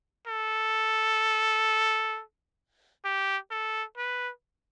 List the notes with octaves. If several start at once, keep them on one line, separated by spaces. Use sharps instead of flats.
A4
G4
A4
B4